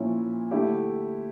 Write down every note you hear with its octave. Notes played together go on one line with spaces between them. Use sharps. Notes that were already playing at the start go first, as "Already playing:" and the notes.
Already playing: A#2 F3 C#4 E4
D3 A3 E4 G4